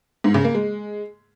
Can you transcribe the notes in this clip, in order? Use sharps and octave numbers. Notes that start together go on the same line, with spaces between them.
G#2
C#3
A#3
G#3